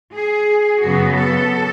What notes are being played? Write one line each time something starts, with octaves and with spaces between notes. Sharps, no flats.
G#4
F#2 C#3 F#3 B3 F#4
A4